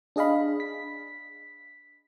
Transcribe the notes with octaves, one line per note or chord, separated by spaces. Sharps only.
D4 G#4 D#5 F5 B5
B6